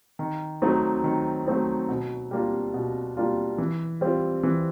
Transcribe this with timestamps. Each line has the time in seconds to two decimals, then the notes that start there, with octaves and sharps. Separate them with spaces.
0.19 D#3
0.62 F#3 A3 C4 D#4
1.04 D#3
1.47 F#3 A3 C4 D#4
1.89 B2
2.31 G3 A#3 D4 F4
2.74 B2
3.17 G3 A#3 D4 F4
3.58 E3
4.01 G3 C4 F4
4.43 E3